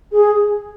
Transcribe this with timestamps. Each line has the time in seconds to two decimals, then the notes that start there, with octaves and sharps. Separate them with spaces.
0.11 G#4